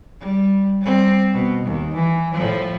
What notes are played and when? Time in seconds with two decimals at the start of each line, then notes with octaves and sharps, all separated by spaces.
0.20 G3
0.81 G3 C4
1.34 B2
1.66 D#2
1.95 E3
2.34 A2 F3